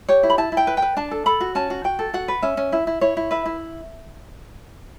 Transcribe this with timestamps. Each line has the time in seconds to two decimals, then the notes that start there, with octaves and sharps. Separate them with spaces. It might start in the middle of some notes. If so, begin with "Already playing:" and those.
0.08 G4 C#5
0.23 E4
0.30 B5
0.38 E4 A5
0.52 E4
0.57 G5
0.67 B4
0.77 G5
0.82 B4
0.97 D4 A5
1.11 A4
1.26 A4 B5
1.41 F#4
1.55 C#4 A5
1.70 F#4
1.84 F#4 G5
1.99 A4
2.14 F#4 F#5
2.28 B4
2.42 C#4 E5
2.57 C#4
2.72 E4 E5
2.87 E4
3.01 E4 C#5
3.17 E4
3.31 B4 E5
3.46 E4